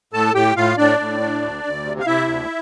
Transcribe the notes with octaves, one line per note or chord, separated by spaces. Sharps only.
A2 A4 A5
A2 G4 G5
A2 F4 F5
A2 D4 D5
A2
D4
D2
D2
C3
F5
C3 E4 E5
D2